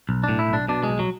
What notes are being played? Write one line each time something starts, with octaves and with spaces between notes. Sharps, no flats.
B1
D4
A2
E4
B1 D4
B2 D4
G#3
B1
F#3